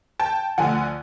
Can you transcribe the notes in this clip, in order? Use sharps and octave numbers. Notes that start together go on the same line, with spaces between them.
G5 A5
D2 D3 F3 F#5 G#5